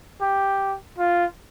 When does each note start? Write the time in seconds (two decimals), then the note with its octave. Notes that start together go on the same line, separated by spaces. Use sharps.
0.21 G4
0.98 F4